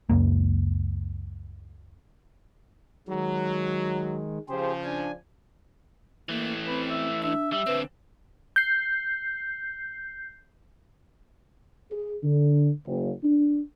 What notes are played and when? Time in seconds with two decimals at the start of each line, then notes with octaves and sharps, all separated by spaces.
0.10 C#2 F#2 A#3
3.08 D#3 F#3 G#3
4.49 C#3 F3 G4 G#4 C5
4.85 D4 G#5
6.29 E3 A3 A#3
6.67 C4 B4
6.90 E5
7.23 D4 E5
7.52 G3 E5
7.67 D3 C4 B4
8.56 G6 C7
11.91 G#4
12.23 D3
12.87 F#1
13.23 D4